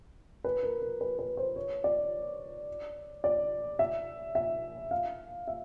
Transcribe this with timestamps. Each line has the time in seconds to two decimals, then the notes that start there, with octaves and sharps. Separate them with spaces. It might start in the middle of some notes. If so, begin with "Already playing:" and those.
0.44 B4
0.63 A#4
0.82 A#4
1.01 B4
1.19 B4
1.37 C5
1.56 C#5
1.84 D5
3.24 D5
3.79 E5
4.35 E5
4.91 F5
5.48 E5